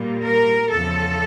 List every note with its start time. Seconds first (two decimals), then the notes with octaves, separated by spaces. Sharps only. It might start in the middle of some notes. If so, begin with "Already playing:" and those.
Already playing: A#2 G3
0.21 A#4
0.69 E2 C#3 F3 A4